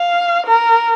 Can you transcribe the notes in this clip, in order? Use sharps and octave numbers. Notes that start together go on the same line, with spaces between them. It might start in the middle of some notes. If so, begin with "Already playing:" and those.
Already playing: F5
A#4